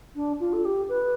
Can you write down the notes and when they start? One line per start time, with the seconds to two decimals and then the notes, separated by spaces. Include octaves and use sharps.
0.15 D4
0.39 F4
0.53 A4
0.64 G4
0.88 B4